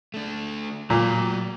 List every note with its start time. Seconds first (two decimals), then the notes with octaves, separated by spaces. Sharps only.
0.14 A3 D4
0.90 A#2 F#3 D5